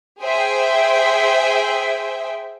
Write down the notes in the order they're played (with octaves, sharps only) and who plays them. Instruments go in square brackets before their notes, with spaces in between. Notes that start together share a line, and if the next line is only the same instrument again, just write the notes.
[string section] G#4 C5 E5 G5